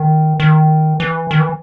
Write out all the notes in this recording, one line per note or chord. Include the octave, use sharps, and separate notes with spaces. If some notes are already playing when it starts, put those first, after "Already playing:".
Already playing: D#3
D#3
E3
D#3
E3